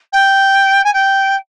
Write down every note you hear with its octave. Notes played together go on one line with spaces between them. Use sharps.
G5
G#5
G5